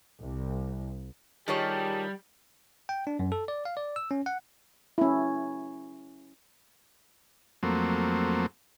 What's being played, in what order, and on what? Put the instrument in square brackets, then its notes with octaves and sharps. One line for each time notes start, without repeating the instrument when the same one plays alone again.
[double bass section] C2
[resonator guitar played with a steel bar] D#3 F4 C#5 [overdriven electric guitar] G3 [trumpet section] G4 G#4 A5
[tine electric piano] G5
D4
F#2
A4
D5
F5
D5
E6
C#4
F#5
[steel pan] C#4 E4
[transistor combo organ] F2 F#3 A3 A#3 C4